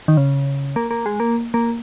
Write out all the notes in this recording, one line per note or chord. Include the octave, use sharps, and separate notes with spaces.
D#3
C#3
A#3
A#3
G#3
A#3
A#3